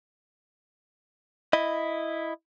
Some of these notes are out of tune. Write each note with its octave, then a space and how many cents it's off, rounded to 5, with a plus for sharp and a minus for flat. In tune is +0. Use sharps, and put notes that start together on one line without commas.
E4 +0 D#5 +0